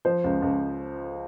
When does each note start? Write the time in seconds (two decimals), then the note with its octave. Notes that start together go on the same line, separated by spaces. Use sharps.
0.05 F3 C5
0.24 C#2
0.42 C#2